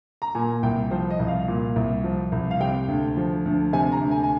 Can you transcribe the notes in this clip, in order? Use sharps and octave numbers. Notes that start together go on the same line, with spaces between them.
A#5
A#2 G#5
C2 G5
F3 C5
D#5
C2
F5
A#2
C2
F3
C2
F5
C3 G5
D2
F3
D2
C3 G#5
A#5
D2
G#5
G#5